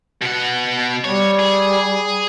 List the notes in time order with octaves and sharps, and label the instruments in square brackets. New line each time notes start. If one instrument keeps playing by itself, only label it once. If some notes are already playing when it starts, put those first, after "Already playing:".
[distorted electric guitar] B2 F#5
[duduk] G3 [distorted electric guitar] C#5
[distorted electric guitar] G#4